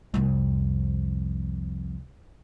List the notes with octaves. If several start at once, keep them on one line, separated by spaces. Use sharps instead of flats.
C2 F2